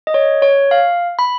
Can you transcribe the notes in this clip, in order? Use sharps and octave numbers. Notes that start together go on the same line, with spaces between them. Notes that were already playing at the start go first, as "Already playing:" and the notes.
D#5
C#5
C#5
F5
B5